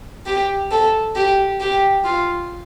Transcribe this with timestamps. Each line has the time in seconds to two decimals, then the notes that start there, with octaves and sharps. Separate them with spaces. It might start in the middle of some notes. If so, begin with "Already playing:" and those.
0.27 G4
0.71 A4
1.15 G4
1.61 G4
2.05 F4